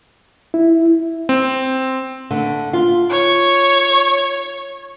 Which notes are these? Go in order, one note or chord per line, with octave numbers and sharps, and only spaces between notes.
E4
C4
D3 A3
F4
C#5